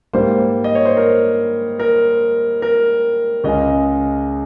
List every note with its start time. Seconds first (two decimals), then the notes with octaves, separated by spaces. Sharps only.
0.13 G#2 G3 A#3 C5
0.64 D#5
0.75 C#5
0.85 C5
0.97 A#4
1.79 A#4
2.62 A#4
3.44 C#2 C#3 G#3 D#5